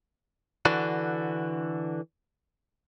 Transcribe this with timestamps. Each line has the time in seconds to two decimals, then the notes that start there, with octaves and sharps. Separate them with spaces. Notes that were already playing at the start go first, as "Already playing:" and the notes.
0.65 D3 E3 D4 F#4